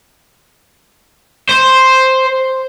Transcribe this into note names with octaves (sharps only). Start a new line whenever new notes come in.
C5